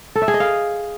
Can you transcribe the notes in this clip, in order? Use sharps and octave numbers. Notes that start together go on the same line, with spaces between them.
A4
E5
G#4
D#5
F5